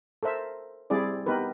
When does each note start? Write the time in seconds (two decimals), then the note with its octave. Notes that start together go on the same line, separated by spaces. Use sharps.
0.23 A4 A#4 C5 E5
0.90 G3 C4 E4 G#4 D5
1.26 B3 D#4 G4 A#4 B4